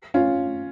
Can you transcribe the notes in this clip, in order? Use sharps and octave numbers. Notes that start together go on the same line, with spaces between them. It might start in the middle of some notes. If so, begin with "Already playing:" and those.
C#4 F4